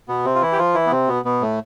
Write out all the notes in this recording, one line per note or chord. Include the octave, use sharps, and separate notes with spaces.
B2 B3
C3 C4
F4
E3 E4
G4
F3 F4
E3 E4
B3
C3 C4
B2 B3
B2 B3
A2 A3